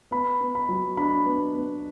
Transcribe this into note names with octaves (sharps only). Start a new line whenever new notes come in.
B3 B5
B3
B5
F#3
D4 B5
B3
B3